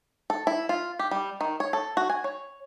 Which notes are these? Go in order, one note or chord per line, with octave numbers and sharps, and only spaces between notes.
A4
E4
F4
G4
G3
D#3
C#5
A4
F#4
G#5
C#5